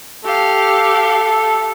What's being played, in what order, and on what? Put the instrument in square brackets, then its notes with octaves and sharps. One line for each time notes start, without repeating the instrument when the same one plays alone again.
[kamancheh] G4 F5 [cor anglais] A4